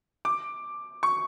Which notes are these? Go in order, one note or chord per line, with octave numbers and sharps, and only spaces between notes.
D6
C#6